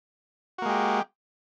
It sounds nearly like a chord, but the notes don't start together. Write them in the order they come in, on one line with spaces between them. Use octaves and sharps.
F#4 A#3 G#3 G4